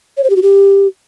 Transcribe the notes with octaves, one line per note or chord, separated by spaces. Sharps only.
C#5
C5
G4
F#4
G4